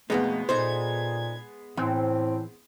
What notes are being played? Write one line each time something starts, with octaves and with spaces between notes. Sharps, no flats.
F2 B2 G#3 A3 B3 D#4
A#2 D#4 A4 C5 G#6
A2 E3 C4